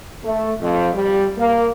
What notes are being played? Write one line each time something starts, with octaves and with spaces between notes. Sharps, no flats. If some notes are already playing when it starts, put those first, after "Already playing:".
A3
F2
G3
A#3